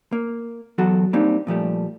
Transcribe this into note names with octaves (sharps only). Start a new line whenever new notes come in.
A#3
E2 F#3 F#4 A4
G3 A#3 C4 D4 D#4
A#2 F3 G3 A3